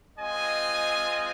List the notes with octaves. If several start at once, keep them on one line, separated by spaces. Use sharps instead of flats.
G#3 C4 F4 D#5 G#5